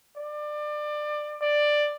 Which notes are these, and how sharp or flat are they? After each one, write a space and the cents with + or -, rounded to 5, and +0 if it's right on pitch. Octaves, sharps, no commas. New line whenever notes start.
D5 +25
D5 +10